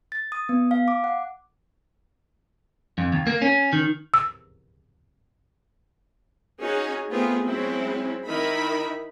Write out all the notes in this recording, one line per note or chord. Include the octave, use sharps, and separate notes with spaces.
A6
D#6
B3
F5
D6
F#5
F2
D#2
A#3
C#4
D#3
E6
C#4 D#4 F#4 G#4 C#5
A3 B3 C4 F4 G#4
F#3 G#3 C4 C#4 E4
D#3 D#4 E4 A#4 E5 B5